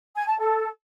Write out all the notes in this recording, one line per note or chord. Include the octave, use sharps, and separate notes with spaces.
G#5
A5
A4